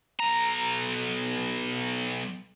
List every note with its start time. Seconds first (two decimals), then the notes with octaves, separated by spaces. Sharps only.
0.20 B1 A#5